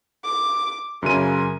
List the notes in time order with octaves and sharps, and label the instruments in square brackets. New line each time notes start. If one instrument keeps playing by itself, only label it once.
[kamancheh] D6
[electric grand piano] F#2 C#3 D#7 [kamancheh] A#4 G#5